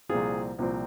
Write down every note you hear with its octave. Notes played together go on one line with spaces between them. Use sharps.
C2 A#2 F3 C4 F4 G#4
C2 A#2 F3 C4